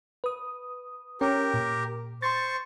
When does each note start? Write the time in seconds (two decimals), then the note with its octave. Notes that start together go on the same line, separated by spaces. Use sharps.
0.24 B4 D#6
1.21 C#4 G4 A#4 C#5 G5
1.54 A#2
2.22 C5 C6 C#6 A6